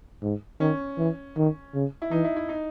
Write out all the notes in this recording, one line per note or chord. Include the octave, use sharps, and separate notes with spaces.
G#2
D#3 C#4
E3
D#3
C#3
E4
E3 D#4
E4
E4
D#4